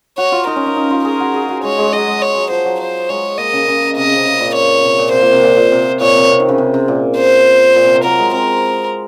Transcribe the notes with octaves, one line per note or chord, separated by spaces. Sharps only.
F#4 C#5
F4
D#4 A#4
C#4
C#4
D#4
F4
G#4 A#4
F#4
G#4
F#4
G#3 C#5
G#3
F#3 D#5
G#3
C#5
F#3
F3 C5
F#3
C5
G#3 C#5
A#3 D#5
C#3
C#3
C3 D#5
C#3
C3
C#3
A#2
C#5
C3
A#2
C3 C5
A#2
C3
A#2
A#2
C3
A#2 C#5
C3
C3
D#3
C#3
C3
C3
A#2
C5
A#2
C3
C3
F#3 A#4
G#3
C4 A#4